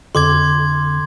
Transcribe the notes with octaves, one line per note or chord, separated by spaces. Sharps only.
F2 D3 C6 D6 G#6